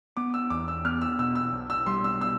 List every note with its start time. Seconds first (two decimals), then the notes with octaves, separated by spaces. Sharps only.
0.17 B3 D6
0.34 E6
0.50 E2 D6
0.68 E6
0.85 B3 F6
1.01 E6
1.19 B2 E6
1.35 E6
1.53 B1
1.70 E6
1.86 G3 C6
2.04 E6
2.20 B2 E6